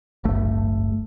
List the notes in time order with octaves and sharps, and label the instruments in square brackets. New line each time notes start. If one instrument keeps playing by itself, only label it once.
[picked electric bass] D1 G#1 G2 A3